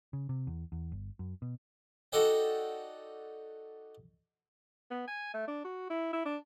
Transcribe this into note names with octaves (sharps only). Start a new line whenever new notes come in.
C#3
C3
E2
E2
G1
F#2
B2
D#4 F#4 A4 D5 F#5 G5
B3
G#5
A3
D4
F#4
E4
E4
D4